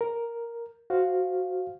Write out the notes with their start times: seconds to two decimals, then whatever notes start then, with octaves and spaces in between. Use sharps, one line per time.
0.01 A#4
0.90 F#4 C5 F5